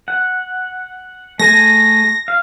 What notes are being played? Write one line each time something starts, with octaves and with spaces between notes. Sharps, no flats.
F#5
A3 G#4 G#5 A#6
F5